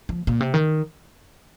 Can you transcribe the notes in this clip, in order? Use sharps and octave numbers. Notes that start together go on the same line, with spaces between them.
F3
A#2
C3
D#3